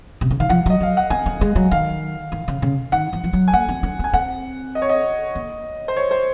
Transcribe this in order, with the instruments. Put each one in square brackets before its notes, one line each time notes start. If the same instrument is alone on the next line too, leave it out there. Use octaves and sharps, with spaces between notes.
[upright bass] C3
C#3
[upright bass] D#3 [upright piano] F5
[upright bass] F3 [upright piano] F#5
[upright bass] F#3 [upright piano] D#5
[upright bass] F#3 [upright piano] F5
[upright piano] F#5
[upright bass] C4 [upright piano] G#5
[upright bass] C4
G#3
F#3
[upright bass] D#3 [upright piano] F5
[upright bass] D#3
C#3
C#3
[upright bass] D#3 [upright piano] F#5
[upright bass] F3
F3
F#3
[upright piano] G#5
[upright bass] A#3 [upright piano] F#5
[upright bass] C4
C#4
[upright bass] C4 [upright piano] G#5
[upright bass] C4 [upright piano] F#5
[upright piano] D#5
C#5
D#5
[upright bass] A#3
[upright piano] C5
C#5
C5